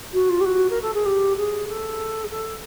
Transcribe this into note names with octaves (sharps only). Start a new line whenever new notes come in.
F#4
F4
G4
F#4
A#4
A4
G#4
G4
G#4
A4
G#4
A4